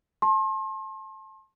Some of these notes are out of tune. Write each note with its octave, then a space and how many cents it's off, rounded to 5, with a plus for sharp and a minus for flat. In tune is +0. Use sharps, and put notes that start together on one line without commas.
A5 -5 C6 +40